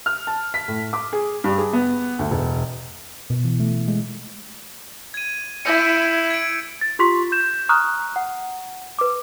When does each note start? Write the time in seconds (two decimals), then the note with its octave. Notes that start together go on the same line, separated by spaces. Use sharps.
0.06 F6
0.27 A5
0.54 B6
0.68 A2
0.93 D6
1.13 G#4
1.44 G2
1.58 G#4
1.73 B3
2.19 D2
2.31 E1
3.30 B2
3.44 E3
3.60 A3
3.88 G#3
5.14 G#6 D#7
5.65 E4 E6 G6 C#7
6.30 G#6 D7
6.81 A6
6.99 F4 G4 C6 C#6 B6
7.32 G6 E7
7.69 A#5 C#6 D#6 F6 F#6
8.16 F#5
8.99 B4 D6